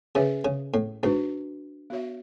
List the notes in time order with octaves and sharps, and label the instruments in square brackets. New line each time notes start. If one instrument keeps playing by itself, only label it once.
[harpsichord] C#3 [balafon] C#4 G#4 B4 E5
[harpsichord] C#3
A2
[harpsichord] G#2 [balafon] D4 F#4 B4
[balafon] B3 F#4 C#5 E5